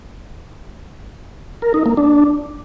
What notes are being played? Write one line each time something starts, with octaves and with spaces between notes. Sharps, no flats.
A#4
D#4
A#3
D4